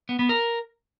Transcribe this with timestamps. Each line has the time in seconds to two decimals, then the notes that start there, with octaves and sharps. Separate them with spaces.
0.09 B3
0.19 B3
0.29 A#4